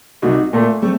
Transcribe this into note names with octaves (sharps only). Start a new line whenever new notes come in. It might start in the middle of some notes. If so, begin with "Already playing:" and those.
C2 D#4 F#4
A#2 A3
A3 C4